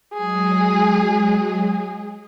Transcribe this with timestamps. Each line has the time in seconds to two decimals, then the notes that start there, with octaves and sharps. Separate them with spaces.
0.13 F#3 G#3 G#4